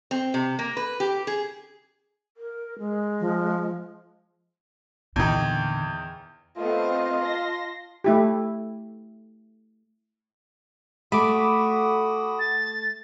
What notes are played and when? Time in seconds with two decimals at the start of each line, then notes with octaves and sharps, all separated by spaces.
0.11 C4
0.34 C3
0.59 A#3
0.77 B4
1.00 G4
1.27 G#4
2.37 A#4
2.79 G#3
3.20 F3
5.16 E2 A#2 D3 D#3
6.58 A3 B3 C4 F4 D#5 F5
7.23 A5 C6 A#6
8.04 A3 E4 G4
11.12 A3 F#4 B5 D6 D#6
12.39 A6